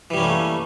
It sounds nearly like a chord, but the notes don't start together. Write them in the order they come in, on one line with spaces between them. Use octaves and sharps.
E3 G3 C#4 A#3 A3